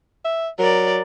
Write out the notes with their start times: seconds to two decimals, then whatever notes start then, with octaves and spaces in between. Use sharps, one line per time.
0.25 E5
0.59 F#3 A#4 D5